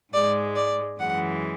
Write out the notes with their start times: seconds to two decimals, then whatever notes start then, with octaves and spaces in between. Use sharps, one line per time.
0.13 G#2 G#3 D5
0.56 D5
0.99 F#2 E3 G#3 F#5